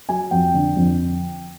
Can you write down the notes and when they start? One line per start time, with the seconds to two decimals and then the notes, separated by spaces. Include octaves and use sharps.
0.09 F#3 G#5
0.31 F2 G5
0.54 D3
0.76 F2